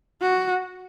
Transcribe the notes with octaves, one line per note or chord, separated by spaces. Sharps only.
F#4